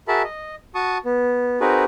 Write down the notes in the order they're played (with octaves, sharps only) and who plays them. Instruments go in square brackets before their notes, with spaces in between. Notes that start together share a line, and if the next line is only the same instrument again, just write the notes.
[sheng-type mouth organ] F#4 G#4 A#4 E5 A5 B5
D#5
F#4 A5 C#6 D#6
B3
C4 D#4 F#4 G#4 A#4 B4